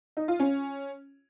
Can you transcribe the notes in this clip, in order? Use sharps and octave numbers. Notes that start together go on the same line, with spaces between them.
D#4
F4
C#4